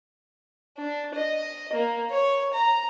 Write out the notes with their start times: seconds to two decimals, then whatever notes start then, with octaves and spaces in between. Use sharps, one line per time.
0.78 D4
1.15 D#5
1.73 A#3
2.11 C#5
2.54 A#5